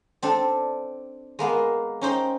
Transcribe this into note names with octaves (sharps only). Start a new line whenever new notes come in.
C4 D4 A4
G#3 A#3 B3
C#4 D#4 C5 G5